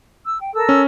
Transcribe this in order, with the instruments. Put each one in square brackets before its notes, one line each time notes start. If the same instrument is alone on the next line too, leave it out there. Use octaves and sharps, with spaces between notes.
[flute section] E6
G5
A4 A#4 E6
[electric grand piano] C#4